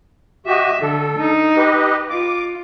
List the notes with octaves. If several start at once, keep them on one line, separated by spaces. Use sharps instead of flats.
F#4 G4 D#5 E5
D3 A4
D#4
G4 B4 D#5
F4 D6